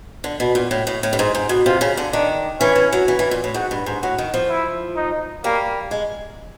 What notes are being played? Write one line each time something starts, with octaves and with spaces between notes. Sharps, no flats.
D3
B2
A#2
A2
A2
A2
G2
G#2
G#2
B2
C3 F4
C#3
D3
D#3 D4
E3 C#4
E3
F#3
E3
E3
A#2
A2
G#2 F#4
G2
G#2
A2 F#4
D#3
F3
E4
D#4
G3 A#3
G#3